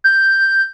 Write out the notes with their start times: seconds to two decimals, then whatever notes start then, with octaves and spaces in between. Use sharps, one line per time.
0.04 G6